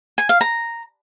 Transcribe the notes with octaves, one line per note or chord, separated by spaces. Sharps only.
G#5
F5
A#5